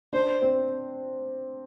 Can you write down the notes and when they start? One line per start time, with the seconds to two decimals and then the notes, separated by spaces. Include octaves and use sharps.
0.13 D4 C5
0.42 C4